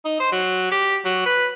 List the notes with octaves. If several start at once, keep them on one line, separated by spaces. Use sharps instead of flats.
D#4
C5
F#3
G4
F#3
B4